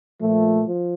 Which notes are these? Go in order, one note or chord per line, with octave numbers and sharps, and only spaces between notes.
A#2 F3 A3
F3